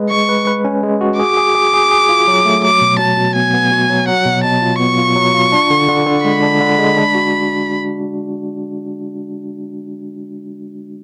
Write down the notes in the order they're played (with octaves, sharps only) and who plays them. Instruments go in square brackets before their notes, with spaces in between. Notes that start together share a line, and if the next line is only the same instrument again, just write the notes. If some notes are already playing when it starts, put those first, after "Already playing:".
Already playing: [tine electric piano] G#3 B4
[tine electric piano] G#3 [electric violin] C#6
[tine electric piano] B4
B4
C#4
G#3
F#4
[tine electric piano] G#4 [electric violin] D6
[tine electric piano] G#4
G#4
G#4
G#4
F4
F#3
A3
[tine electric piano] F#3 [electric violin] D6
[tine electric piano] B2
[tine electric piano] F#3 [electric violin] A5
[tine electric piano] B2
[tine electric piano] B3 [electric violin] G#5
[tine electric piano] B3
F#4
F#3
[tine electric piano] F#3 [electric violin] F#5
[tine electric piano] B2
[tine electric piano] B2 [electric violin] A5
[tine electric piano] F4
[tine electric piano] B3 [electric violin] C#6
[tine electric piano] F4
F#3
F4
D4
D3
D3
D3
[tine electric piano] G#3 [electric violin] B5
[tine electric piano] D4
D3
G#3
D4
F#4